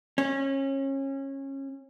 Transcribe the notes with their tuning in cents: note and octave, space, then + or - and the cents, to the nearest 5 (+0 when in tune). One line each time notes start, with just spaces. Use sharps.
C#4 -25